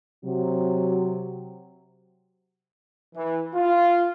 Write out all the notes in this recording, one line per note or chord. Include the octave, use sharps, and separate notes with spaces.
C3 F#3
E3
F4